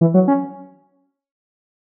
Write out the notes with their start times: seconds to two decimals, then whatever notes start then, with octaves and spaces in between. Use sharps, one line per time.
0.01 E3
0.14 F#3
0.28 C#4